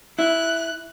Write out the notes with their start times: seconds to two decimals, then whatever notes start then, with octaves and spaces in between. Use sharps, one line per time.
0.19 E4 F#6